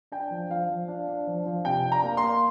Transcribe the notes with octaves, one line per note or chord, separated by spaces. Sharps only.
D4 G5
F3
F3 F5
F3
D4
D4
F3
F3
C3 G5
D4
A#5
A#3
C6
A#3